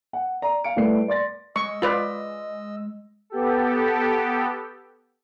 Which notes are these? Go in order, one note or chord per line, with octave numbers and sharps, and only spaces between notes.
F#5
D5 A#5
F5 C#7 D7
A2 G3 A3 B4 C7
D5 C6 A6 A#6
G#3 D#5 C#6 E6
F4 B4 D5
B3 G4 A4